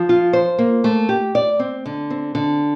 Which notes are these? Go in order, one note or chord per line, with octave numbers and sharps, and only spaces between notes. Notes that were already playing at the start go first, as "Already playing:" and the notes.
Already playing: F3
F4
C5
A#3
A3
G4
D5
C4
D3
C4
D3